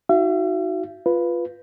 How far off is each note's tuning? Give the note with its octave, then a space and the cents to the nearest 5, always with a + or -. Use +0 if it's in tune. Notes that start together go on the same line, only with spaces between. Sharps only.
D#4 +35 F#4 +0 E5 +45
F4 +0 B4 +0